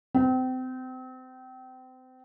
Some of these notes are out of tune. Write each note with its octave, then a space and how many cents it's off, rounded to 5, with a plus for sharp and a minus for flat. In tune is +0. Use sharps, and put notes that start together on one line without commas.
C4 -30